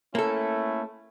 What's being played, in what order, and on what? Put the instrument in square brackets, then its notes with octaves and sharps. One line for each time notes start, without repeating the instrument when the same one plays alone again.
[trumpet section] A3 C#4 E4 [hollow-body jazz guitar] A#3 A4